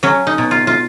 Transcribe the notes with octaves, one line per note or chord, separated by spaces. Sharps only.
F#3 C#4
D#4
B2
F4
F4